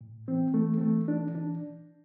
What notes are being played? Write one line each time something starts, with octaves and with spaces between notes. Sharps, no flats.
A2
E3 C4
E3 A3
C4
E3 A3
E3 D4
E3 D4